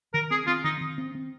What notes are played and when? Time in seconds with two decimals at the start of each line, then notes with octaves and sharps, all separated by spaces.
0.14 D#3 A#4
0.31 C4 G#4
0.47 C4 F4
0.64 D#3 D#4
0.81 D#3
0.98 C4
1.15 C4